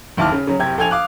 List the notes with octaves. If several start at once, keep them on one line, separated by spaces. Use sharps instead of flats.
F#1 D#2 E4 A5 D6 F6
C#3
C#3 F#3
F#1 C3 G4 G5 G#6
A#1 A4 G5 G#5 G#6 F7
F5 D6 D#6 F#6